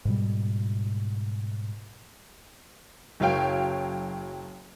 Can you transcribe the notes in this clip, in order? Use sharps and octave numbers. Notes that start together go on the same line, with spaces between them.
G#2 B2 G3
F#1 F#3 C#5 F5 G5